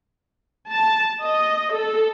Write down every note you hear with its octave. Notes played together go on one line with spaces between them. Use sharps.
A5
D#5
A4